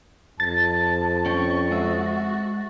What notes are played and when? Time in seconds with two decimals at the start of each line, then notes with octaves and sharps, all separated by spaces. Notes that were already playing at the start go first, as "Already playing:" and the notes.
0.40 F2 A5 A6
1.26 C#4 G5 C#6
1.71 G#3 F#4 G#4 E5